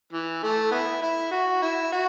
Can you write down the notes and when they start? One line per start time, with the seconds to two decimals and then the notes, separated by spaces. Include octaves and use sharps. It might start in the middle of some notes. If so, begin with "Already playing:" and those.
0.13 E3
0.43 A3
0.72 B3 E4
1.02 E4
1.31 F#4
1.62 E4
1.92 F#4